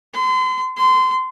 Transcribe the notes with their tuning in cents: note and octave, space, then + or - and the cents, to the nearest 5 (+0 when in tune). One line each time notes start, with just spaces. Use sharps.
C6 -35
C6 -25